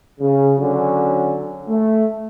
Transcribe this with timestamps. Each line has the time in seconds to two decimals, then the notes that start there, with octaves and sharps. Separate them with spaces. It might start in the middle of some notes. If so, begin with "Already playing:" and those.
0.20 C#3
0.58 D3 F#3 C#4
1.68 A3